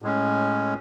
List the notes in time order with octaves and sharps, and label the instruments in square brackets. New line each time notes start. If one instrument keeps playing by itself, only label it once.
[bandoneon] A2 G#3 C#4